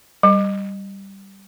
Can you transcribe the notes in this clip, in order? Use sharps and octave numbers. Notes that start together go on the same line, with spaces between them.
G3